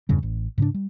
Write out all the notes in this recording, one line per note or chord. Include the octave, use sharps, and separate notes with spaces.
E2 G2 C#3 G3
A1
G#2 C#3 C#4 D4
G3